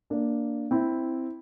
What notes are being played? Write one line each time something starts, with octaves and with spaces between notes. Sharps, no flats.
A#3 D4
C4 E4